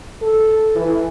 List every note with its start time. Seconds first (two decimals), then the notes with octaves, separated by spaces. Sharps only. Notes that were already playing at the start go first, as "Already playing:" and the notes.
0.22 A4
0.75 E3